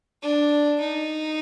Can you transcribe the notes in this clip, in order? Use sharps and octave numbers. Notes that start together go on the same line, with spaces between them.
D4
D#4